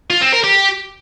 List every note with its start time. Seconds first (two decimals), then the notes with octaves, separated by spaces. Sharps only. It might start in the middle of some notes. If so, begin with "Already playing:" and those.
0.10 F4
0.22 C4
0.33 A#4
0.44 G4